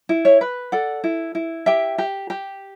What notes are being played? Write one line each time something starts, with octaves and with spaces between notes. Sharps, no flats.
E4
C#5 E5
B4
A4 D5 F#5
E4
E4
G4 E5 G5
G4
G4